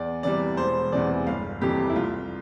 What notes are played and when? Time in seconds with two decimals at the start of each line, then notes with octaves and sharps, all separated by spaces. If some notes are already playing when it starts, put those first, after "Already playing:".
Already playing: E2 D5
0.23 C3 E3 G3 D5
0.57 E1 C5
0.92 E2 C3 E3 D5
1.27 G1 F5
1.61 F2 C3 E3 G3 G4
1.90 E4
1.96 C2 F4